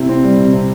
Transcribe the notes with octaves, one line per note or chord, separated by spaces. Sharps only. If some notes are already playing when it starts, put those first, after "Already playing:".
Already playing: C3 E4
C4
G3
C3
C3